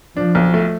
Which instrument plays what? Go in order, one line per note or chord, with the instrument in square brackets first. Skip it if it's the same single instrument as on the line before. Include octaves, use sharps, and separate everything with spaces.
[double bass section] F3 [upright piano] D4
[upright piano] B1
A3